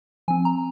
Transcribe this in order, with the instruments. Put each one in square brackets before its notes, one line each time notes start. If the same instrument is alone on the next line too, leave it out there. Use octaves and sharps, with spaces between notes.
[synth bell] F3 C4 G#5
A#5